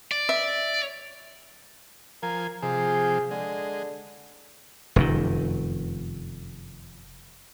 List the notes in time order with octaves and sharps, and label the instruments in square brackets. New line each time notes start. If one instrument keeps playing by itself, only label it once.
[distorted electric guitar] D5
[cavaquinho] E5
[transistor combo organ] F3 G#5 [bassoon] A#4
[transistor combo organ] C3 F3 [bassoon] G#4
[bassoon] D3 [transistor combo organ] G#3
[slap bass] F1 F#2 D#3